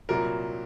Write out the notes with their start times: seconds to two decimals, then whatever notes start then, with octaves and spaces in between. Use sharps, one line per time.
0.09 C2 A#2 F#3 A#4